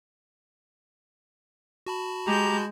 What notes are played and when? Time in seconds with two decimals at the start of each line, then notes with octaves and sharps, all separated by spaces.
1.86 F#4 A5 B5
2.27 G#3 G4 A#5 G6